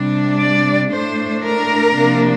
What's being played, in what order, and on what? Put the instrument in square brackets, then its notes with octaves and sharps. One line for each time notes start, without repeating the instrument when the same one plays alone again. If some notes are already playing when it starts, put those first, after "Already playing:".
Already playing: [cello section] C3 G3 D4
D5
A2 A3 D4 C5
A#4
C3 F3 A#3 D4